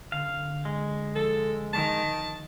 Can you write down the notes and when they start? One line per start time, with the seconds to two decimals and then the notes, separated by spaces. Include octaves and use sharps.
0.12 D3 F5
0.65 G#3
1.16 F3 A4
1.73 D#3 A5